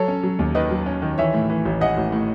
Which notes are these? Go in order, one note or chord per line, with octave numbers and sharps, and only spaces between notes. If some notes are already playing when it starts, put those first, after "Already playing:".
Already playing: F#3 A4 C#5
C#4
F#3
D#2
D#3 B4 D#5
F#3
C#4
D#3
E3 C#5 E5
A2
E3
A1
E3 D#5 F#5
A1
A2